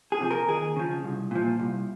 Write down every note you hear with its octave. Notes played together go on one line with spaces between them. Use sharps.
G#4
C3 F3
A#4
D#2 G#4
C#3 F3
C2
A#2 F3
C2